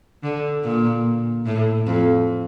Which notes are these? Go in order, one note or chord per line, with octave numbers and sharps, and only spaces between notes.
D3
A#2
A2
F2